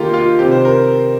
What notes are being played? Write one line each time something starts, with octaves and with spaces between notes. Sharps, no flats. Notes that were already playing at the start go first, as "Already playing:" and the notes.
Already playing: D#3 A#3 F4 G4 A#4 C6
F4
C3 D#3 C4 G4
C5
A#4